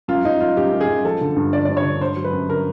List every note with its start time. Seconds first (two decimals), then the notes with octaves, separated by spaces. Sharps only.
0.08 F#2 F4
0.25 F#2 D#4
0.40 F#2 F4
0.57 F#2 G4
0.72 F#2
0.81 G#4
0.89 F#2
1.05 F3 A4
1.21 D3
1.36 G2
1.53 D3 D5
1.65 G2 D5
1.77 C#5
1.85 D3
2.01 D3 C5
2.16 F#3
2.24 B4
2.33 F#2
2.49 D3 A#4